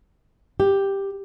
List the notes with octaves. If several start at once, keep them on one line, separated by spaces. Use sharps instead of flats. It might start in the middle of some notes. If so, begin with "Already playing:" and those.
G4